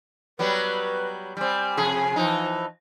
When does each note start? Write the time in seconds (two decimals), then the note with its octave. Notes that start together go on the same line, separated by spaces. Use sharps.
0.39 F#3 G3 B3 B4
1.37 G3 C4 G#5
1.77 F2 C3 G#4
2.16 E3 F3 D#4